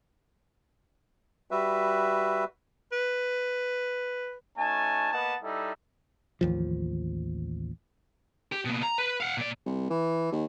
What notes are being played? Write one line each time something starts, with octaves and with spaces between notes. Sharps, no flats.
G3 F#4 B4 E5
B4
A3 C#4 D#4 F#4 G#5 A5
A#3 B3 B4 D#5 F#5 A5
G3 D#4 E4 A4
A1 D#2 F3
G4
B2 A#3
A#5
B4
F5 F#5
A#2 D5
C2
E3
D#2